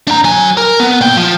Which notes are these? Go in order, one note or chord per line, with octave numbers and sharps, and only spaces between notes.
D4 A#5
F#3 G#5
A#4
B3
A#2 G5
F3